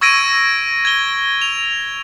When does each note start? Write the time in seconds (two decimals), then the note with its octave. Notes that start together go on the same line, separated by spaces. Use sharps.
0.01 C#6 E6 G#6 A#6 D7 D#7
0.85 G#6 G7
1.41 F7